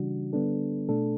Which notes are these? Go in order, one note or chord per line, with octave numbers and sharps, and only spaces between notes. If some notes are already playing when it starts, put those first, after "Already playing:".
Already playing: C#3 E3 G3 D4 F#4
D3 G3 B3 D4 A4
B2 A3 D4 A4